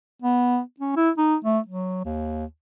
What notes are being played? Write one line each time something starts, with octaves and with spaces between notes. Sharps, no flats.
B3
C#4
E4
D#4
A3
F#3
D#2